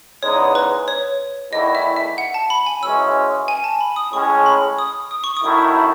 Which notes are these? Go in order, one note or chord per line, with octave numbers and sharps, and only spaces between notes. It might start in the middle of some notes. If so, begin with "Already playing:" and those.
E2 C#3 G#3 B3 D#4 C#5
B4
C#5
E2 D#3 A3 E4 D#5
E5
E5
F#5
A5
B5
G#5
F#2 E3 G#3 C#4 E6
G#5
A5
B5
D#6
A2 G#3 C#4 C#6
B5
D#6
D#6
C#6
D#6
F#2 D#3 A3 E4